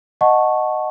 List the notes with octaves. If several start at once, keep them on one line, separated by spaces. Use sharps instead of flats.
D#5 F#5 A5 C#6